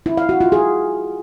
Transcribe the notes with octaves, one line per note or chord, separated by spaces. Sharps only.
E4
F5
F#4
F4
G#4